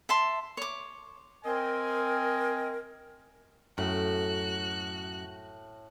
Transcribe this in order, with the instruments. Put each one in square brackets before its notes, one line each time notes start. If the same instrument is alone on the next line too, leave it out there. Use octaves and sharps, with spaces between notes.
[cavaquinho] E5 A5 C6
C#5 D6
[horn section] C4 D#5 G#5 [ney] A#4
[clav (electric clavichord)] F#2 [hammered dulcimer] A2 [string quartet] F#4 F#6